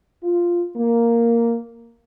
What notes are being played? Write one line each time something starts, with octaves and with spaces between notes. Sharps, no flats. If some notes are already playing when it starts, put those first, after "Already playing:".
F4
A#3